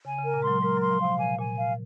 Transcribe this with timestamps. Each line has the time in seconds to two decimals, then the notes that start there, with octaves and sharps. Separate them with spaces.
0.05 C#3 G#5
0.19 C#3 A#4
0.34 A#2
0.42 F#3 G#3 C6
0.56 F#3
0.62 G#3 A#4
0.77 F#3 C6
0.91 F3
1.00 C3 F5
1.19 A#2 G#5
1.39 A#2 G#5
1.57 F5